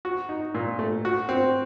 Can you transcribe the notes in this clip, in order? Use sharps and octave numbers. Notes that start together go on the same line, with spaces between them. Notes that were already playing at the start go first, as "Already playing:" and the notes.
F#4
D#4
A#2
A3
F#4
C4